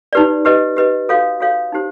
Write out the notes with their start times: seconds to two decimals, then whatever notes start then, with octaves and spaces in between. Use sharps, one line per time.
0.13 D#4 G4 B4 D5
0.45 G4 B4 D#5
0.76 G4 B4 D#5
1.09 F#4 A4 C#5 F5
1.40 F#4 A4 C#5 F5
1.72 D#4 G4 C5